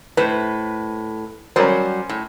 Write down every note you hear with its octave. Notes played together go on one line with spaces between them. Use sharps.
A2 B4 C5
F#3 G3 C#4 A#4 C5 D5
A2